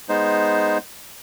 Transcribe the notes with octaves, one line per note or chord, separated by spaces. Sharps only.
G#3 B3 D#4 C5